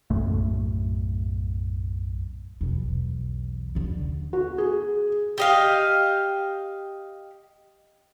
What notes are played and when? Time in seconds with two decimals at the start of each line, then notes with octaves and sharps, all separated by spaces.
0.10 B1 F#2 A2 A3
2.61 B1 E2
3.75 D#2 D3
4.33 F#4
4.58 G#4
5.38 G4 D#5 F5